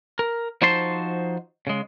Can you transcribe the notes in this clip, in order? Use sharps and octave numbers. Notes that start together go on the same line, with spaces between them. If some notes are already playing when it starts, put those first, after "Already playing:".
A#4
F3 D#4 F#4 C5 A5 C6
C#3 G#3